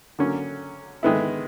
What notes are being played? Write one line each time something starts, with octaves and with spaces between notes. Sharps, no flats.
D3 F#3 A#3 C#4
D#3 G#3 B3 E4